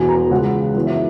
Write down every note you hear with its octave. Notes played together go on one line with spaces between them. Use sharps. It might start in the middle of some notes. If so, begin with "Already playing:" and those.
Already playing: E1 E2 B2 G#5
A#5
C#2 C#3 G#3 F#5
F#2 E3 B3
E5